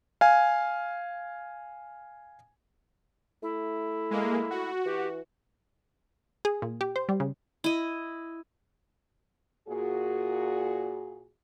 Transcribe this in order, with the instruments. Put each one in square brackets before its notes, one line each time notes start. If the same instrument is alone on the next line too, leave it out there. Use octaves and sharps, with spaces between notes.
[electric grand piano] F5 G#5
[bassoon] A3 [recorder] E4
[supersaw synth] G#3 A#3
F#4
[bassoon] E3 [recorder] G4
[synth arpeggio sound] G#4
A#2
G4
C5
G3
C#3
[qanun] E4 D#5
[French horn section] A#2 F#4 G#4